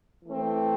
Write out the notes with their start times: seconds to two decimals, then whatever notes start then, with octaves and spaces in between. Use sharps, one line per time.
0.25 E3 A3 C4